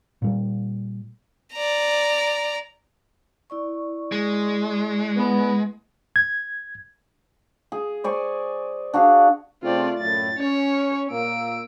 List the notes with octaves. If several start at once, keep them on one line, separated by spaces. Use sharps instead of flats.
A#2 G3
D5 A#5
E4 D5 C#6
G#3
B3
G#6
G#4
C5 D5 G#5 C#6
D4 F#4 G#4 F5
C#3 A3 C4 F4 D5
F#2 A2 A6
C#4 C#5
A#2 A#3 E6 D7